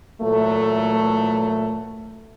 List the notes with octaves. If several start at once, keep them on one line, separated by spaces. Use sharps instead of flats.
A#2 E3 F#3 A3